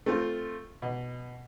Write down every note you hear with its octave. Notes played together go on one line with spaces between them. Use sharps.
A3 C4 F4
B2